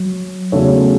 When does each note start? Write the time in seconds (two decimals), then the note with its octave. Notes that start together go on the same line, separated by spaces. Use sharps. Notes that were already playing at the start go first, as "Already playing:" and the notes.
Already playing: F#3
0.52 E2 C#3 A3 F#4 C#5